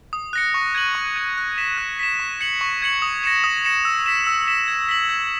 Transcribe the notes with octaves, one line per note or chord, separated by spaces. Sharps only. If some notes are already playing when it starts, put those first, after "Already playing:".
D#6
F#6 A#6 C#7
C#6
G#6 D#7 F#7
C#6
G#6 D#7 F#7
F#6
B6 E7
F#6
B6 E7
C#6
G#6 C#7 F#7
C#6
G#6 C#7 F#7
D#6
A#6 C#7 E7
D#6
A#6 C#7 E7
E6
B6 E7
E6
B6 E7
G#6
B6 F#7
G#6